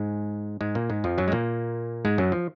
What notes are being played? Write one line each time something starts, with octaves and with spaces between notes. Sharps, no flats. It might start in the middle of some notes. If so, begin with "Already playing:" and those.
Already playing: G#2 G#3
G#2 G#3
A#2 A#3
G#2 G#3
F2 F3
F#2 F#3
G#3
A#2 A#3
G#2 G#3
F#2 F#3
F3